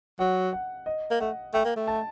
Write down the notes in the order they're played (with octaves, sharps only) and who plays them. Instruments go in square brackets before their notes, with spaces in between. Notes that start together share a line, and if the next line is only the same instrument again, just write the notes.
[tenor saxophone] F#3 [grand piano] F#5
[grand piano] F#5
D#5
[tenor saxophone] A#3
[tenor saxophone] A3 [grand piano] F#5
[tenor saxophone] A3 [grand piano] G5
[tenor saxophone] A#3
A3
[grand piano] A5